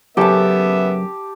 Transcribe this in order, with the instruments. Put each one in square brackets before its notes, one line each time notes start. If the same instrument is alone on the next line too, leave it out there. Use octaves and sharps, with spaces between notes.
[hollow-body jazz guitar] F#2 C#3 A4 [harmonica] B3 E5 [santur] G4 A5